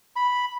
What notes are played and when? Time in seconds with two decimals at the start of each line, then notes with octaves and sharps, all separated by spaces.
0.16 B5